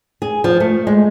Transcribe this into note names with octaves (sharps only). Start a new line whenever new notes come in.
G#4
F3
A3
G#3